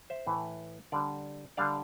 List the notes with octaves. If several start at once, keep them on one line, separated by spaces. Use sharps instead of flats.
C5 E5
A2 E3 A3 E4
D3 G3 D4 D5 F5
D3 G3 D4 D5 F5